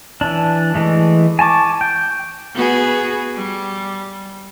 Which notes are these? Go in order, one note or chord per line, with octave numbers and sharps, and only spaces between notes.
E3 D4
E3 G#3 A3
G#5 A5 C#6 D6
G5
B3 F#4 G#4
G3